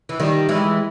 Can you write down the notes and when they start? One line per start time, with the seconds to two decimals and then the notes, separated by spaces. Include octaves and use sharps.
0.09 E3
0.20 D#3 G3
0.49 E3 G#3